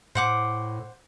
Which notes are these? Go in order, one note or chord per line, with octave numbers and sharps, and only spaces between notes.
A2 C5 F#5 D6